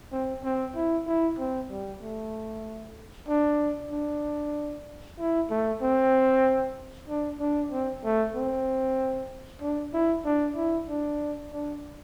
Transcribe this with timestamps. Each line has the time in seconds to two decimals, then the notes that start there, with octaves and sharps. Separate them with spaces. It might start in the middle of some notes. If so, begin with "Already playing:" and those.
0.12 C4
0.44 C4
0.76 E4
1.07 E4
1.39 C4
1.71 G3
2.02 A3
3.29 D4
3.91 D4
5.19 E4
5.50 A3
5.82 C4
7.08 D4
7.40 D4
7.72 C4
8.04 A3
8.35 C4
9.62 D4
9.94 E4
10.25 D4
10.56 E4
10.89 D4
11.52 D4